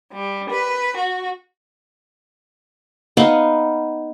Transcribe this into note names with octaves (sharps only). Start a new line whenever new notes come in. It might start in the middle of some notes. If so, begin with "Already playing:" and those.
G3
B4
F#4
B3 D#4 F5 F#5